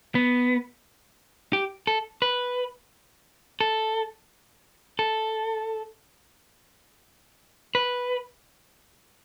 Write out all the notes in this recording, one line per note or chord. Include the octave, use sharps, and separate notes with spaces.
B3
G4
A4
B4
A4
A4
B4